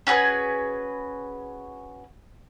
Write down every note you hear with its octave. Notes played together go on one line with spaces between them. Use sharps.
C#4 F#4 G#4 B4